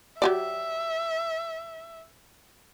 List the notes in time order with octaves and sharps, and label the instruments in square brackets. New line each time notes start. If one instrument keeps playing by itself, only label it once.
[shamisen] F#3 G4 D5 [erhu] E5